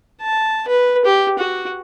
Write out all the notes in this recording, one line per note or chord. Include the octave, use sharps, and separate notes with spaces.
A5
B4
G4
F#4